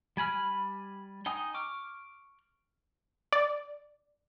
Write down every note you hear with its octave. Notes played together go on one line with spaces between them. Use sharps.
G3 G#5 B5 F6
D#4 G5 G#5 D#6
C#6 D6 F6
D5